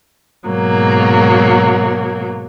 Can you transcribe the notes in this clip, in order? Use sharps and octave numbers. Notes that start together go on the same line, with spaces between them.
G#2 B2 F#3 A#3